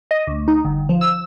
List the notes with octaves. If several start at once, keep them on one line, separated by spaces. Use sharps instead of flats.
D#5
D2
D#4
G1
F3
E6